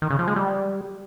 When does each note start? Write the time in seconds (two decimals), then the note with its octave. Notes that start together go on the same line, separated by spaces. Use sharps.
0.02 D#3
0.10 C#3
0.19 F3
0.28 G#3
0.36 G3